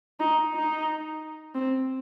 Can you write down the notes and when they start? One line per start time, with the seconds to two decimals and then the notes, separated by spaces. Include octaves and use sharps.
0.20 D#4
0.54 D#4
1.55 C4